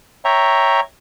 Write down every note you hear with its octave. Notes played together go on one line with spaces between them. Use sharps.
C#5 E5 G5 A#5